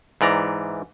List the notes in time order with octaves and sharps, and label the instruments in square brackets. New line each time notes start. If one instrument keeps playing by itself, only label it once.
[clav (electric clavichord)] G#2 E3 D5 A#5